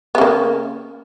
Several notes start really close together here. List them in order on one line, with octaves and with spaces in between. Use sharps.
B3 C#3 A#3